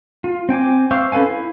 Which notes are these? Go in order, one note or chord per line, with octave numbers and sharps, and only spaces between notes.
F4
C4 G5 G#5 D6
C5 E5 F5 C#6 D6
C#4 A4 B4 F5 G#5
E4